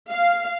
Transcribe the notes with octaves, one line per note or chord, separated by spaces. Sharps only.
F5